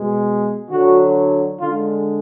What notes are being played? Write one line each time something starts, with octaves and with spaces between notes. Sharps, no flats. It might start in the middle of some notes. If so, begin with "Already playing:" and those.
Already playing: B2 G#3
D3 F#3 F#4
D3 G#3 F4